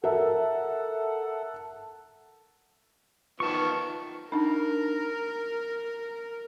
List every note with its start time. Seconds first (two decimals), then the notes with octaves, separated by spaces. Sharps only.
0.04 A4 A#4 E5 F#5
3.40 D#3 F3 B3 A5 C#6
4.32 D4 D#4 A#4